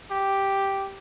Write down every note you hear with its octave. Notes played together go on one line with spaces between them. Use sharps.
G4